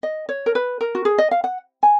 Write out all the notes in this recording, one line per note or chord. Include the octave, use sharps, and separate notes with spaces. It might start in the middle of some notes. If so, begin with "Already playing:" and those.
D#5
C#5
A#4
B4
A#4
F#4
G#4
D#5
F5
F#5
G#5